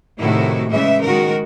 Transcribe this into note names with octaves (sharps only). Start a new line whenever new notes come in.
A2 C3 D#3 A3 E4 F#4
C#3 E3 G#3 E5
D#3 G#3 F#4 A#4